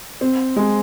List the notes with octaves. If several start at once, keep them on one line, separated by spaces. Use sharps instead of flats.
C4
G#3